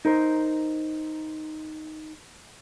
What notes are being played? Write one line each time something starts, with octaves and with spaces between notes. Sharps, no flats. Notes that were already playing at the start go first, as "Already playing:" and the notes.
D#4 A#4 C5